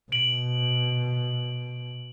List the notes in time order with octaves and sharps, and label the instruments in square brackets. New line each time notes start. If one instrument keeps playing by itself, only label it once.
[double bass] B2 [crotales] D7 F#7